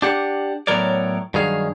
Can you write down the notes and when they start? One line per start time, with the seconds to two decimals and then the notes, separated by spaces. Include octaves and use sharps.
0.02 D4 G4 F#5
0.67 A2 F#3 B3 A#4 C#5 D5
1.34 G2 D#3 F#3 G#4 F5